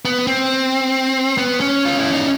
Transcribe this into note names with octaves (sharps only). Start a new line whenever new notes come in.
B3
C4
B3
C#4
F4
E4
D#4